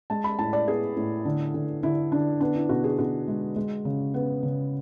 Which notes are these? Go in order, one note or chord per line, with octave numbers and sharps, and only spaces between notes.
G#3 A5
B5
A2 A5
D5
B3 G#4
A2
D3
D3
D3 E4
D3 D4
B3 D4
E4
B2 F#4
G#4
B2 F#4
G#3
G#3
C#3
B3
C#3